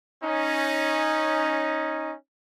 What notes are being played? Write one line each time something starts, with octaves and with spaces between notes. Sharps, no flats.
C#4 D#4